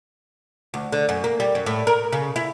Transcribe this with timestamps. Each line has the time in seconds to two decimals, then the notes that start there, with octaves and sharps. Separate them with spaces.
0.74 D2
0.92 D3
1.09 F#2
1.24 A#3
1.40 G3
1.55 F#2
1.66 A2
1.87 A#4
2.12 C#3
2.36 E4